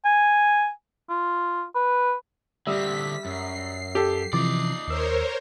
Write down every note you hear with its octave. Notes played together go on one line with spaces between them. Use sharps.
G#5
F4
B4
D3 G3 C4 E5 D#6 E6 B6
F#2 C7
G4 A4
C3 E3 F3 D#4 D5 D6
D#2 A#4 C5 C#5 E6